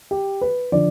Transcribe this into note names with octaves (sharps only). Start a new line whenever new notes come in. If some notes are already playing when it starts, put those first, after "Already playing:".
G4
B4
D3 F3 D5